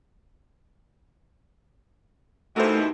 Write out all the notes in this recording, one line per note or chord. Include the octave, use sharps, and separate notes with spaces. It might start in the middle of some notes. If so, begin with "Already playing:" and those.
G2 B2 E3 A3 D#4 F#4 A#4 C5